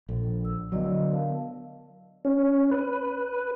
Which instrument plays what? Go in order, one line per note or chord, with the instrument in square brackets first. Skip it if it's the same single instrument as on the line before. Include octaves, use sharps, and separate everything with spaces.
[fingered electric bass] A#1 [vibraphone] A4
[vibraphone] E6
[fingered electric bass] D3 F#3 [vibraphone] B3 D5 D#5
[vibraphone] A#4 F5 A5
[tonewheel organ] C#4
B4